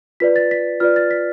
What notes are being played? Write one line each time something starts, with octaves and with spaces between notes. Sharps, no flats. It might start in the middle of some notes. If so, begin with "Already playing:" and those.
F4 B4 D5 B6
A6
B6
F4 B4 D5 F6
A6
B6